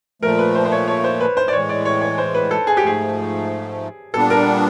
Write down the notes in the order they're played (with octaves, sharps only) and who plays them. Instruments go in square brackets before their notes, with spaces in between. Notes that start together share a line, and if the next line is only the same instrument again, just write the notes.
[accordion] A#2 F3 A3 [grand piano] A#4
[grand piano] B4
C5
C5
C#5
C#5
C5
B4
C5
D5
[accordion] A2 E3 G#3 [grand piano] C#5
[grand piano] D5
C#5
C#5
C5
B4
A4
G#4
G4
[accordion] G#2 F3 A3 [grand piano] G#4
[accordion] A#2 G3 B3 D4 [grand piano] A4
[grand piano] A#4